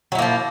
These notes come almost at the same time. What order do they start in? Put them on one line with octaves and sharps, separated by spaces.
F#3 E4 A#3 F3